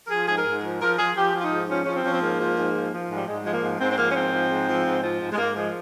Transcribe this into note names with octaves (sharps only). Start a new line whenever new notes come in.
A#4
F3 G#4
G#2 G#4
A#4
G#2
F3
F3 A#4
F3 G#4
F3 G4
F3 F4
D#4
G#2
F3 C#4
F3 C#4
C4
F3 C#4
C4
G#2 A#3
F3
G#2
F3
F3
G#2
G3
G#2 G#3
F3 G#3
A#3
G#2
G#2 C4
C4
F3 A#3
C#4
G#2 C4
F3
G#2
F3
G#2
F3
G#2
G#3
G#2 A#3
F3 G#3